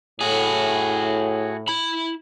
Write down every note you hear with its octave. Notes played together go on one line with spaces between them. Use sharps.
A2 F#4 G#4
E4 B5